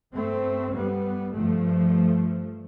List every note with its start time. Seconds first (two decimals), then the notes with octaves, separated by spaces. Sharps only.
0.15 G2 A3 C4
0.75 G3 B3
1.35 G2 F3 A3